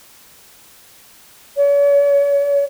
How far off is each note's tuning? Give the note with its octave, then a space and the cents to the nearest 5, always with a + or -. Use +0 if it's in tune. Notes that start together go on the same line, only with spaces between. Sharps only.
C#5 +40